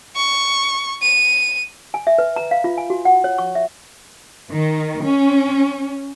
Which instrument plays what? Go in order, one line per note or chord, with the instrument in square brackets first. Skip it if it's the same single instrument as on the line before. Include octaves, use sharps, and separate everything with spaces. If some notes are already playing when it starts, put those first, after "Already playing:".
[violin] C#6
D#7
[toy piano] G#5
E5
B4
A#5
F5
F4
G#5
F#4
F#5
C#5
C#6
E5
[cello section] D#3
C#4